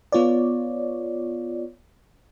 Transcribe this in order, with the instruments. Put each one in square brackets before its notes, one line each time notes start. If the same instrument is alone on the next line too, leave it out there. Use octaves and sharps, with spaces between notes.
[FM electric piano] B3 F4 C#5 D5